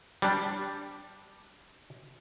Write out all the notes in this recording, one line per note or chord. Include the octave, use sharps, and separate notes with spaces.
G3 D4